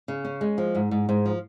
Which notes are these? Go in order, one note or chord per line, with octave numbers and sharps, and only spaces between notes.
C#3
C#4
G#3
F3
G#2
G#2
G#2
F3